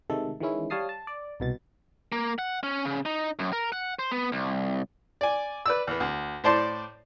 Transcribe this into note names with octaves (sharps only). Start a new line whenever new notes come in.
C3 D#3 G#3 A3 A4
D#3 E3 G#3 C#4 E4
G3 C#5 F5 A5 D#6 C7
A5
D5
C2 B2 A6
A#3
F#5
C#4
C#3
D#4
F#2
A#4
F#5
C5
B3
C2
D5 G#5
B4 D5 E6
E2 B3
D2
A2 C5 D5 A5 C6